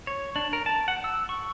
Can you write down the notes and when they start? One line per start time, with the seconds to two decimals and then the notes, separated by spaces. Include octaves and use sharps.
0.07 C#5
0.36 D4
0.53 A#4
0.66 A5
0.88 F#5
1.04 E6
1.29 C#6